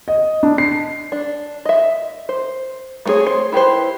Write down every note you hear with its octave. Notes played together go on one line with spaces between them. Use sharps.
D#5
D4
C7
D4
D#5 E5
C5
A3 B3 C4 G#4 C#5
C5
E4 G4 B4 C5